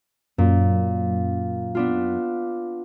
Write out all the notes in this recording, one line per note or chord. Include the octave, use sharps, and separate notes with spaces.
F#2 A#2
B3 D4 F4